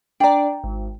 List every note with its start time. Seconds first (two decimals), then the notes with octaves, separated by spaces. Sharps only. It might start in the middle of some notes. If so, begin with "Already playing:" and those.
0.20 D4 D5 G5 A#5
0.64 G#1